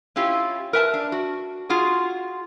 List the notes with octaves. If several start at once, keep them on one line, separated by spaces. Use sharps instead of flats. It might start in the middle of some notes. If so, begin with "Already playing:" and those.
C#4 E4 F4 G4
A#4 B4 E5 G#5 A5
D4
F#4
F4 F#4 G#4